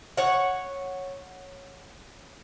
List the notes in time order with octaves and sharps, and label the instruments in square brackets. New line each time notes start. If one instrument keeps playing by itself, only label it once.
[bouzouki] C#5 F#5